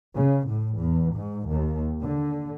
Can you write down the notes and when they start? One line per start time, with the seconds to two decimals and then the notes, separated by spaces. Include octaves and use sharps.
0.15 C#3
0.48 A2
0.78 E2
1.14 G#2
1.48 D#2
2.02 D3